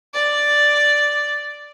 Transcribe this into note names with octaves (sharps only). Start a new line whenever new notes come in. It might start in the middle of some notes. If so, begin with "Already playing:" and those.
D5